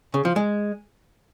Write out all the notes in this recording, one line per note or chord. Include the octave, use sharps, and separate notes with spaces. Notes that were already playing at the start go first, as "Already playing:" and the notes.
C#3
F3
G#3